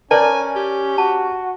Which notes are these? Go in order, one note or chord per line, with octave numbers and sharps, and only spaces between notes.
C#4 A#4 C#5 D5 G#5 A5
G4
F#4 A5